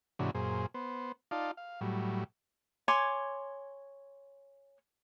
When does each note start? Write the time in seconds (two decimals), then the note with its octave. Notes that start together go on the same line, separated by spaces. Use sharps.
0.19 G#2 C3 E3 C#4 D4 F#4
0.35 F#2 A#2 G#4 C5
0.74 B3 C5
1.31 D#4 F4 D5 F5 A5
1.57 F5
1.81 A2 F#3 G3
2.88 C#5 G#5 C6 D6